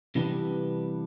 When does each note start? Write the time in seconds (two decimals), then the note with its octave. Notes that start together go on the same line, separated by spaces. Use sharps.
0.15 C3 E3 G3 B3 D4